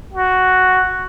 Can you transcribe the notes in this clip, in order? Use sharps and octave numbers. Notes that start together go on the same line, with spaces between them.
F#4